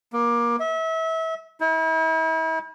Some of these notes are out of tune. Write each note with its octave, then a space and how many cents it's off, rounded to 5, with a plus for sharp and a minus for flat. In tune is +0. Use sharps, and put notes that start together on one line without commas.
A#3 +25
E5 -30
E4 -40